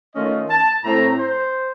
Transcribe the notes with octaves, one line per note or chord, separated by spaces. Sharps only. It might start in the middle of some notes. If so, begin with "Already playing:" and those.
D#3 A3 C#4 F4 D#5
A5
A2 A3 C4 A#5
C5